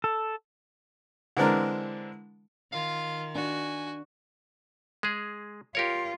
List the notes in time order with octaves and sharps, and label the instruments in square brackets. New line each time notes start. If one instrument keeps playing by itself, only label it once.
[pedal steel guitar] A4
[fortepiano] D3 E3 G#3 C4 D4 A#4
[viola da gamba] D#3 [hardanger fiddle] F4 [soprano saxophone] F5
[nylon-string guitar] D4 [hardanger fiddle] F#4 [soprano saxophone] G#5
[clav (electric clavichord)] G#3 G#4
[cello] F4 [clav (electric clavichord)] G4 A#4 C#5